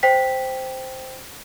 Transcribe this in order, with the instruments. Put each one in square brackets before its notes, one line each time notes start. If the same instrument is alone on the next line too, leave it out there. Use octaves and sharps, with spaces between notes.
[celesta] C5 G5 B6